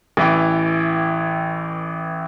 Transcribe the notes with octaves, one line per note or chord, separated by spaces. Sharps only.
A1 E3 G5